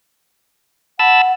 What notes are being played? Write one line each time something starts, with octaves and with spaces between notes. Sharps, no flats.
F#5 A5 B5 E6